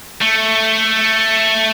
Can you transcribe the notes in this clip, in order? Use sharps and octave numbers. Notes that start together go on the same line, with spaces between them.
A3